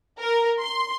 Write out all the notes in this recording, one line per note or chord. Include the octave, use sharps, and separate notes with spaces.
A#4
C6